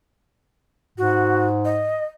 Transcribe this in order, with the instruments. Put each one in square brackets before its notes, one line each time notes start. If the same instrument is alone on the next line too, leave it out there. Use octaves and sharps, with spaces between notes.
[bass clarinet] G#2 [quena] F#4
[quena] D#5